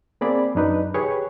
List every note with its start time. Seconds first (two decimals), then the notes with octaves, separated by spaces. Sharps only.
0.21 A#3 C4 G#4 D5 B5
0.55 F#2 D4 D#4 B4
0.94 G4 G#4 B4 C#5 C#6